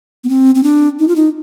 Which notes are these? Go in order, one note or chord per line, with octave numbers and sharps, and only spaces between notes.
B3
C4
C4
D4
D#4
F4
D#4